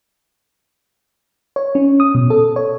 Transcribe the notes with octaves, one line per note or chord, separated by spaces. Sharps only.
C#5
C#4
D#6
B2
A4
C#5